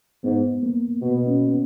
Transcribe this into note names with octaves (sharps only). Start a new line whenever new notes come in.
G#2 B3
A#3
B2 B3
C#4